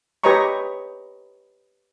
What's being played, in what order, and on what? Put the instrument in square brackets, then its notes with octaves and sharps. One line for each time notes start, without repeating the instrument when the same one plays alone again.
[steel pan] G4 B4 C#5 D#5 A#5 C#6